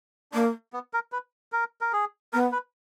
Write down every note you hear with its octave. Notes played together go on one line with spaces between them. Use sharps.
A#3 D4
B3
A#4
B4
A#4
A#4
G#4
B3 A#4
B4